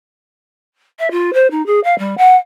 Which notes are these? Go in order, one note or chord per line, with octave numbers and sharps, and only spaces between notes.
E5
F4
C5
D#4
G#4
F5
G3
F#5